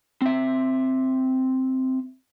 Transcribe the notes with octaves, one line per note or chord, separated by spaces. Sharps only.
C4 E5